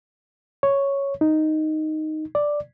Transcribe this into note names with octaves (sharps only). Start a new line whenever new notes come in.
C#5
D#4
D5